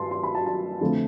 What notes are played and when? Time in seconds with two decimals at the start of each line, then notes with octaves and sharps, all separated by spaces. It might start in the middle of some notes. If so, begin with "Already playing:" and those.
Already playing: G2 A5 C6
0.11 C6
0.23 B5
0.35 A5
0.46 A5
0.81 F2 D3 F3 A3